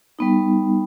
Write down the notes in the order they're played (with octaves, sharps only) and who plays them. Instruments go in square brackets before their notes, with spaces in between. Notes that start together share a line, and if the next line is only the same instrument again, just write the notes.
[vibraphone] G3 B3 D#4